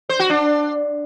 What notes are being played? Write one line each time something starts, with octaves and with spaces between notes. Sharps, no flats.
C5
F#4
D4